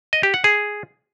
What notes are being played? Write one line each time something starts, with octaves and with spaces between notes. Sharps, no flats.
D#5
G4
F#5
G#4